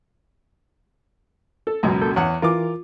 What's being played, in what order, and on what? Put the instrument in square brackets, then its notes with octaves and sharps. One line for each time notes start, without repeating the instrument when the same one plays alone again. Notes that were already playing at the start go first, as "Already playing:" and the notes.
[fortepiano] A4
[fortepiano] C#2 F#2 B2 [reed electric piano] A#5
[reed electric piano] A#3 A4 G6
[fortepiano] E2 F#5 [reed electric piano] C#5
[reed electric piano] E3 A#4 [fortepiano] F4 D6